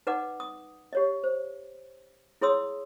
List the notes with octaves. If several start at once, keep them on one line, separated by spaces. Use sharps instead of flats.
D#4 B4 D5 F#5 D6
D#6
G4 C#5 D#5
C5
E4 G#4 C#5 C6 D#6 E6